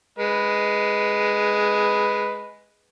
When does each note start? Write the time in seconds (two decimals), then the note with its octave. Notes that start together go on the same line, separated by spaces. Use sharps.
0.18 G#3 B4